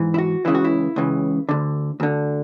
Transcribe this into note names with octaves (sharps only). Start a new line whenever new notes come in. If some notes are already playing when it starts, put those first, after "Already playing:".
Already playing: G#2 E3
E4
F#4
C#2 C#3 E3 E4
F#4
E4
C#2 C#3 E3
D2 D3
D2 D3